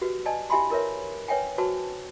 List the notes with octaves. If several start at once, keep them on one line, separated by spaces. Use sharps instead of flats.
F#4 G4 B4
D5 D#5 G#5 A5
E4 G4 E5 G#5 B5 C6
E4 A#4 B4 C#5 E5
B4 C#5 E5 G5 G#5
F#4 B4 C5 A5 C#6